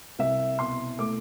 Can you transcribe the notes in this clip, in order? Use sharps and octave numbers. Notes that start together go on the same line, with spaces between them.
C2 E5
B2 C6
A3 D6